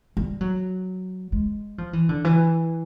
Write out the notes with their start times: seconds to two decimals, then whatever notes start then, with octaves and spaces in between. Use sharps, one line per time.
0.17 G3
0.41 F#3
1.32 G#3
1.78 F3
1.93 E3
2.09 D3
2.24 E3